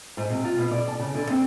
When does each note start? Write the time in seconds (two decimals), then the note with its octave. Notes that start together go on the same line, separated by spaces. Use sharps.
0.17 G#2
0.30 C3
0.45 F4
0.58 B2
0.71 D5
0.88 A5
1.00 C#3
1.15 D3
1.30 C4